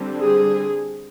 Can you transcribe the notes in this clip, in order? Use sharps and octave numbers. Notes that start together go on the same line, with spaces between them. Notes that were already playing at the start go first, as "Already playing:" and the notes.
Already playing: D3 G3 C4
G#4